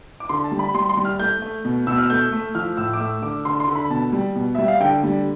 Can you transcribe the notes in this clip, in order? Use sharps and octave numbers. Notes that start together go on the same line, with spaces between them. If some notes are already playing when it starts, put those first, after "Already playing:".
D6
D3 C6
A5
G3
B5
G3 C6
C6
G3
F6
A3 G6
A3
B2
B2 E6
F6
A3 G6
A3
F3 F6
A2 E6
D6
A3 E6
D3 D6
D3 C6
C6
D3
B5
B2 A5
G3
B2
G3 E5
F5
D3 G5
G3